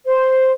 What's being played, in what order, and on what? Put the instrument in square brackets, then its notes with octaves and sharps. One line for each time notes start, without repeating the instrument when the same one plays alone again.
[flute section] C5